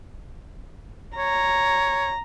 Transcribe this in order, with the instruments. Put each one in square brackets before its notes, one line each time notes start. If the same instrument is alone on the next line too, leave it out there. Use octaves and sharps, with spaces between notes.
[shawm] C#5 [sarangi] A#5